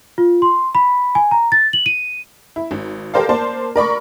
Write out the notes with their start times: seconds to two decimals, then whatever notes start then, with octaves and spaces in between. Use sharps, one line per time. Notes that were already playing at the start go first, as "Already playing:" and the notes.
0.18 F4
0.42 C6
0.75 B5
1.15 G#5
1.31 A#5
1.52 A6
1.73 F#7
1.86 D#7
2.56 E4
2.71 G#1
3.14 G4 A4 A#4 C5 D5 F5
3.29 A#3 C5 D5 A5
3.76 A#4 D5 B5 C#6